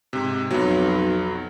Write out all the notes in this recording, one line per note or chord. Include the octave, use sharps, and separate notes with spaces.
G#2 C3
B1 F2 F#3